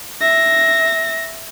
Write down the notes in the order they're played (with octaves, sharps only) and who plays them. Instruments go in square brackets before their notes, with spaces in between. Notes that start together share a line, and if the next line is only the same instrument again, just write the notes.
[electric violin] E5 A#6